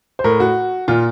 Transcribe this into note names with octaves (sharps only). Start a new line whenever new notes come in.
C5
A2 A#4
F#4
A#2 F4